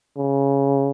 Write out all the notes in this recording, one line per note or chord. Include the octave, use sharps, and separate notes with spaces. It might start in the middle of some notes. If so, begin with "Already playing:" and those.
C#3